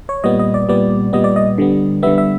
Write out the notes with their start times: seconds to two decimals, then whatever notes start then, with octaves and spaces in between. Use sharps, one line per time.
0.09 C#5
0.24 A#2 G3 B3 D#5
0.39 D#5
0.54 D5
0.69 A#2 G3 B3 D5
1.13 A#2 G3 B3 D#5
1.24 D5
1.36 D#5
1.58 D3 G3 B3
2.03 D3 G3 B3 E5
2.18 E5